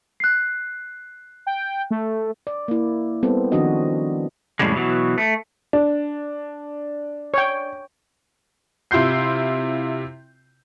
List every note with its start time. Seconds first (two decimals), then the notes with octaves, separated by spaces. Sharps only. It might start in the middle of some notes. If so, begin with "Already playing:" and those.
0.20 F#6 C7
1.47 G5
1.91 A3
2.47 D5
2.68 A#3 E4
3.23 G3 B3 C4 A4
3.52 D#3 F3 D4 F#4 D#5
4.59 F2 A2 C#3 G3 G#3
4.75 B2 E3 F#3
5.18 A3
5.73 D4
7.34 C#5 G5
8.91 C3 E4 F4 C6 G6 C7